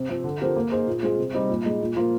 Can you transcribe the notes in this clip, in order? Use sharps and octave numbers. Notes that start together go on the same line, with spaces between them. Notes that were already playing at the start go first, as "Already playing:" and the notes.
Already playing: C3
F3 C4
D3
F3 C4 G4 A#4
A#3
D#4 G#4 C5
A#2
G#3 C4 F4 G#4
C3
G3 C4 D#4
A#2
G#3 D#4
A#2
F3 A#3 F4 A#4